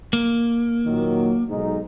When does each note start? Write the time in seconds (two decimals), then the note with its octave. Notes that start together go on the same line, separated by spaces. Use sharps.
0.13 A#3
0.86 A#2 D#3 F#3
1.50 B1 G#2 D#4